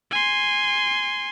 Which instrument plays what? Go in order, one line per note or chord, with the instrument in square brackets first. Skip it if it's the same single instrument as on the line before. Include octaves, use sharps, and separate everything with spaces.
[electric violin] G#5 C6